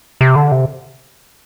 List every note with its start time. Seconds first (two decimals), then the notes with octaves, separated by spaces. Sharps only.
0.21 C3
0.36 D3
0.52 C3